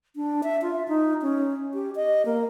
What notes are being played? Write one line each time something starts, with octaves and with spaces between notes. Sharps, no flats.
D4
E5
F4
D#4
C#4
G4
D#5
A#3